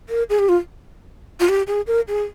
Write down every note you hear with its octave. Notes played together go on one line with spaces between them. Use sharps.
A#4
G#4
G4
F4
F4
G4
G#4
A#4
G#4